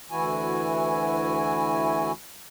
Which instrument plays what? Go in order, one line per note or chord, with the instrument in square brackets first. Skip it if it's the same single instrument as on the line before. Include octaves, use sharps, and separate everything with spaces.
[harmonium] D2 E3 E4 F#4 G#5